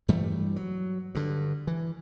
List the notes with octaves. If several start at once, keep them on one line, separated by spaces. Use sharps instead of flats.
G2 E3 G3 A3
F#3
G2 D3
E3